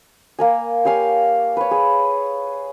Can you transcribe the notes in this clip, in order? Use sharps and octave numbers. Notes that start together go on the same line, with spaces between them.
A#3 A#4 G#5
G4 C#5 F5 G#5
B4 C#5
G#4